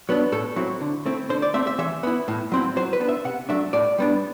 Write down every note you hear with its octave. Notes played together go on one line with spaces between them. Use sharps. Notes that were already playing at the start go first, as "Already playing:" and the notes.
F#3 B3 D4
A2 A4
F#3 C4 E4
D3
A3 C4 E4
D3 C5
D5
A3 C4 E5
E5
E3 E5
B3 E4
A2
F#3 C4 E4
F#3 C5
B4
B3 D4
E5
C3 F#5
F#3 A3 D4 E5
A2 D5
G3 B3 D4